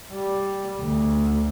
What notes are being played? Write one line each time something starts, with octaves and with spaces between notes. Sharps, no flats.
G3
D2